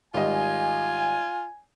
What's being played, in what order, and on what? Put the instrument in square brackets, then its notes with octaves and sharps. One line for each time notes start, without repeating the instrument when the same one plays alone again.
[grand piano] G#1 G3 D#5 [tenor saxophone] F4 [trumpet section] G#5